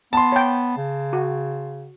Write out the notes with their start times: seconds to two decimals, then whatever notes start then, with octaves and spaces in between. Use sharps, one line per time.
0.13 B3 A5 C6
0.32 C#5 G5
0.77 C#3
1.13 F#4